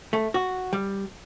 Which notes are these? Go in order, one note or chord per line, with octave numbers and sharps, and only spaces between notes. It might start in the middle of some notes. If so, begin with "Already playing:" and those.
A3
F#4
G3